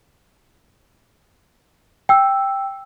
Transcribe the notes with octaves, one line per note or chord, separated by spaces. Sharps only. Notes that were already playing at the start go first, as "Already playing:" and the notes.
G5 E6